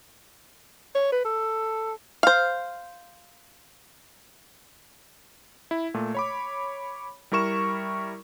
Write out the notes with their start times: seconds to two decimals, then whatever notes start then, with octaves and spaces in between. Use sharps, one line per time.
0.95 C#5
1.12 B4
1.25 A4
2.23 C5 F5
5.71 E4
5.94 A#2 A3
6.15 C#5 B5 D6
7.32 G3 E4 A#4 C#6 E7